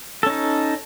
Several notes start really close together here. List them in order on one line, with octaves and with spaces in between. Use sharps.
A4 C#4 D#4